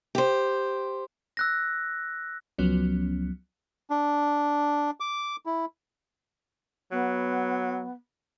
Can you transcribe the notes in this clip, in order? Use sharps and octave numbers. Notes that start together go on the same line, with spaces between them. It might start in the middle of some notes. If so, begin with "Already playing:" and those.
G4 C5
E6 F#6 A#6
C#2 F3 F#3 B3 C#4
D4
D6
E4
F#3 B3